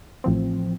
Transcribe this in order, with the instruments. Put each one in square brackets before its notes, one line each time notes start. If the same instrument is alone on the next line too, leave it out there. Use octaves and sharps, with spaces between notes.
[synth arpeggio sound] A1 A2 F3 C4